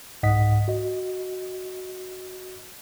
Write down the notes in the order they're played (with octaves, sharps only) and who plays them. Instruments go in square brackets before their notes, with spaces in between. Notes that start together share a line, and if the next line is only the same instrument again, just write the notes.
[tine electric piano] C2 G#2 D#5 F#5 D#6 B6
F#4 D#5